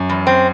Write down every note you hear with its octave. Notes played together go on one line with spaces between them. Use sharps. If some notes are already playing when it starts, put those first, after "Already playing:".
Already playing: F#2
E2
C4